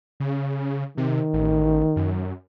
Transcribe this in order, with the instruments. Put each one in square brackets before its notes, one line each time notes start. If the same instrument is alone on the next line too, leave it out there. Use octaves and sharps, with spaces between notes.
[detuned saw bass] C#3
[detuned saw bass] C3 [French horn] D#3
[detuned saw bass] A1
F#2